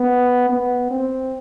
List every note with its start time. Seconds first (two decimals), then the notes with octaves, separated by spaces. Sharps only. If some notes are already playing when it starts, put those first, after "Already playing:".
Already playing: B3
0.49 B3
0.91 C4